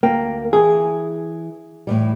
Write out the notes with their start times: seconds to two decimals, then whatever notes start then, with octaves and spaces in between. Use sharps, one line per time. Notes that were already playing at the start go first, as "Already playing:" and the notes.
0.03 D2 A#3 G5
0.53 E3 G#4
1.87 A2 E3 G3